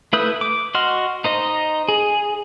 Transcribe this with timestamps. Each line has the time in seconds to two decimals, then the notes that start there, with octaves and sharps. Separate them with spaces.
0.13 A3 E4 B4 D#6 G6
0.41 D6
0.75 F#4 D#5 C6 F6
1.24 D#4 C5 D#5
1.89 G#4